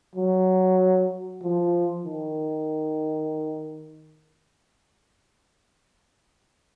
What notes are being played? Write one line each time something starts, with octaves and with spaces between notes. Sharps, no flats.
F#3
F3
D#3